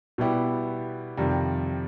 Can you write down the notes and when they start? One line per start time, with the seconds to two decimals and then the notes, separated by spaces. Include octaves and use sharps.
0.18 B2 G3 B3 E4 G4
1.17 F2 C3 D#3 G3